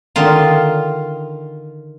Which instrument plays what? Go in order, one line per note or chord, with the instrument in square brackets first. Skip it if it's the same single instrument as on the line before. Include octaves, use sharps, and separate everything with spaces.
[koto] D3 D#3 F4